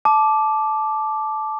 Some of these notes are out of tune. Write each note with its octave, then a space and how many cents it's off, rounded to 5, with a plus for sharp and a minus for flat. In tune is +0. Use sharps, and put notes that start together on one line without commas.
A5 -15 D6 +0